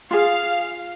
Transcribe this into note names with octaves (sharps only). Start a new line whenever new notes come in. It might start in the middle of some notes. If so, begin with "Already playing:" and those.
F4 G#4 F5